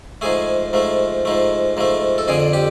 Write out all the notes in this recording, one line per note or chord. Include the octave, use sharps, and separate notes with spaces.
G#2 F3 A3 G#4
G#2 F3 A3
G#2 F3 A3
G#2 F3 A3
A4
F2 D3 F3 G#4
G4